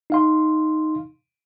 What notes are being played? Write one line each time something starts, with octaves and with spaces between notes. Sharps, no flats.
D#4 F5 C6